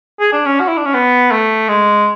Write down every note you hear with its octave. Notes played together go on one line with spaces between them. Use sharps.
G#4
D4
C#4
F#4
E4
D4
C#4
B3
A3
G#3